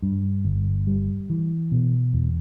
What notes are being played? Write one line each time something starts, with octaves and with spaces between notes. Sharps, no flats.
G2
G1
G3
E3
B2
E2